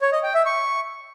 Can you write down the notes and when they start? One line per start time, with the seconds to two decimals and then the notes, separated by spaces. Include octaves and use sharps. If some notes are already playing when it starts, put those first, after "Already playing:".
0.01 C#5
0.12 D#5
0.23 G5
0.35 E5
0.46 C#6